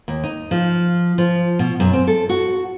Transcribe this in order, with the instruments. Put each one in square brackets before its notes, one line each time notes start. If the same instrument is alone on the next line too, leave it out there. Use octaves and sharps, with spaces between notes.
[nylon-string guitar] D#2
D#4
F3
F3
B2
F#2
C4
A4
F#4